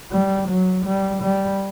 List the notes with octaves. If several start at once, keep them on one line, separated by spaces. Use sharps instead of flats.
G3
F#3
G3
G3